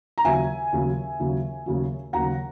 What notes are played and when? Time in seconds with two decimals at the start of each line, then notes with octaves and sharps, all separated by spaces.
0.18 A#5
0.24 D#2 C#3 F#3 E5 G#5
0.72 D#2 C#3 F#3
1.19 D#2 C#3 F#3
1.66 D#2 C#3 F#3
2.13 D#2 C#3 F#3 F#5 A#5